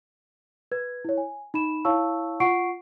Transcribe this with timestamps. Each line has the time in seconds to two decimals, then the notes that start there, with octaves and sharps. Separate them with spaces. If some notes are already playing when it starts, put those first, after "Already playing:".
0.72 B4 G#6
1.05 E4 C#5
1.18 G#5
1.54 D#4 B5 E7
1.85 E4 C#5 F5 A5 C#6 E6
2.40 F4 F#5 C#6 C7 D7